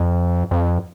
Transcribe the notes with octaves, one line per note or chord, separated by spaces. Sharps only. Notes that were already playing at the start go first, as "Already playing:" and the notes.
Already playing: F2
F2